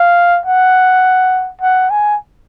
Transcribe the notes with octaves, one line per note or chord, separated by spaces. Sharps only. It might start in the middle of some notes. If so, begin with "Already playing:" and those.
Already playing: F5
F#5
F#5
G#5